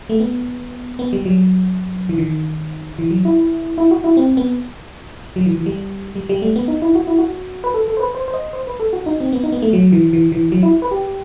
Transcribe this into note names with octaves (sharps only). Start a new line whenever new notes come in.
A3
B3
B3
G3
F#3
E3
D#3
E3
F#3
E4
E4
F#4
E4
C4
B3
F#3
E3
E3
G3
G3
G3
A3
B3
D#4
E4
F#4
E4
F#4
B4
A4
A4
C5
B4
C5
C5
D#5
C5
B4
A4
F#4
D#4
C4
B3
D#4
B3
A3
F#3
E3
E3
E3
F#3
E4
B4
G4